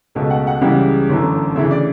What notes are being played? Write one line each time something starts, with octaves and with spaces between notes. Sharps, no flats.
C#2 B2 A3
F#5
F#5
C#2 C#3 E3 G3
G1 F#2 E3 A3
D2 C#3 E3 E5
D5